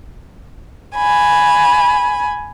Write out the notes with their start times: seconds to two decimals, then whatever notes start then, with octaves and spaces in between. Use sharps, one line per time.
0.96 G#5 B5